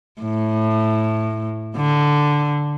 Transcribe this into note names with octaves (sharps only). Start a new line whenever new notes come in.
A2
D3